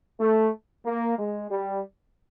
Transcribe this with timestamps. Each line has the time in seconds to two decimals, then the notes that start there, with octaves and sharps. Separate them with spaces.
0.20 A3
0.85 A#3
1.19 G#3
1.51 G3